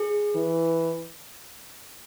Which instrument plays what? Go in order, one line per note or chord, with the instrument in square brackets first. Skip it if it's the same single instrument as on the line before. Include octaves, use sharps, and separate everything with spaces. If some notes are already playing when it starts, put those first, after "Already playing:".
Already playing: [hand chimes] G#4
[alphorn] E3